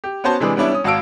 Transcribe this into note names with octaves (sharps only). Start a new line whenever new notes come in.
G4
B3 C#4 F#4 C5 A5
C3 E3 G#3 D4 G#4 B4
G3 B3 C#4 D4 E4
C#4 D#6
G#1 F#4 F5 A5 E6 D7